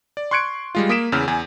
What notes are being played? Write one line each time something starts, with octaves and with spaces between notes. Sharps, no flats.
D5
C6 C#6 F#6 G#6 C#7 D7
G3 G#3 F4
A#3 D#6 B6 D7 E7
E2 C#3 E6 F6
E2 G#5